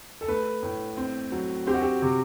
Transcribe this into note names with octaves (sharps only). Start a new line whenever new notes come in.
A4
A3 B4
A2
C4
F#3
C4 G4
F#4
G4
C3